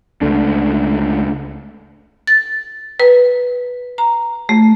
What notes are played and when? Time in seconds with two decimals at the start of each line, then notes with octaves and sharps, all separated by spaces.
0.21 C#2 A3 D4
2.27 A6
3.00 B4
3.98 A#5
4.49 A3